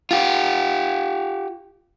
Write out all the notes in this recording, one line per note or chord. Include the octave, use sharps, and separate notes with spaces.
F4 G4